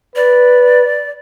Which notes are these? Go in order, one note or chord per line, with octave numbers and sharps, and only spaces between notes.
B4 D5